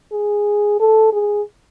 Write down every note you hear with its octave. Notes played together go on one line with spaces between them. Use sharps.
G#4
A4
G#4